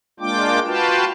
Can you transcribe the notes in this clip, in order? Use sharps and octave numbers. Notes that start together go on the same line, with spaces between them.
G#3 A#3 D4 F4 G5 D6
F4 F#4 B4 F5 G5 A5